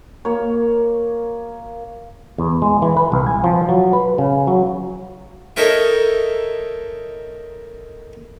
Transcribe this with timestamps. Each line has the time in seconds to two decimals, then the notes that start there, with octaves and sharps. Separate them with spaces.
0.25 A#3 C#5
2.38 E2
2.62 G#3
2.82 E3
2.97 B4
3.12 C2
3.27 G#5
3.44 F3
3.69 F#3
3.93 B4
4.18 C#3
4.47 F#3
5.56 D#4 A4 A#4 C#5 E5 G5